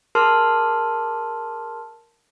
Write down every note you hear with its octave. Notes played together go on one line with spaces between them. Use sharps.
G#4 A#4 A5 C6 F6